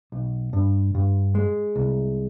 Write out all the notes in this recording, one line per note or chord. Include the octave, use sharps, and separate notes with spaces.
B1
G2
G2
G#3
C2